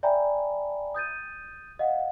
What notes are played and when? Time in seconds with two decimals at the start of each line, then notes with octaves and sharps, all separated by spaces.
0.03 D5 E5 G5 G#5 A#5 B5
0.94 D#6 G6 A6 D#7
1.79 D#5 F5 F#5